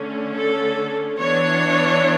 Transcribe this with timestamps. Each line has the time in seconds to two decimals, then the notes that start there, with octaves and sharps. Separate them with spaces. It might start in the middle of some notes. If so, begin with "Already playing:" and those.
Already playing: D3 A3 C#4
0.36 A4
1.19 E3 B3 D4 C#5